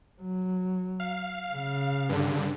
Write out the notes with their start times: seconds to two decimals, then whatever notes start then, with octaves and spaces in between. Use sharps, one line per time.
0.22 F#3
1.00 F5
1.53 C#3
2.09 G2 D3